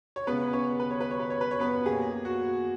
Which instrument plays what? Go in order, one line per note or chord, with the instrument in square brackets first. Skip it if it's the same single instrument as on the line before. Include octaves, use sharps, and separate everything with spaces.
[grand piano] C#5
C#3 G#3 B3 C#4 B4
C#4 C#5
B4
C#5
B4
C#5
B4
C#5
B4
C#5
B3 B4
B2 A#3 C#4 G#4
F#4